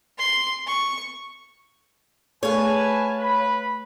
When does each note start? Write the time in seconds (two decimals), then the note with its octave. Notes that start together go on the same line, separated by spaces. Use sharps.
0.18 C6
0.67 C#6
2.43 A3 G#4 A4 B4 C#5 F5 G#5 A5
3.18 B4 B5